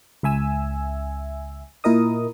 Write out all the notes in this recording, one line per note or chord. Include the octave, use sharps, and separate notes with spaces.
C#2 E5 G#5 E6
A#2 E4 A#4 D#5 D#6